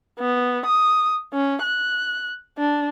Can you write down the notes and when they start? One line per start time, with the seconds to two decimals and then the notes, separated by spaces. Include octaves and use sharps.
0.19 B3
0.65 D#6
1.33 C#4
1.63 F#6
2.58 D4